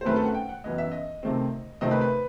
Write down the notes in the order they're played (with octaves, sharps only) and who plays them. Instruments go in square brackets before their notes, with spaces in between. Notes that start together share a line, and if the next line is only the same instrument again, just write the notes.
[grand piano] C5
F#2 D#3 A3 C4 B4
A4
F#5
G5
F#5
F#2 E3 B3 D#5
E5
D#5
C3 D#3 A3 C4
C3 D#3 A3 C4 D#5
B4
B4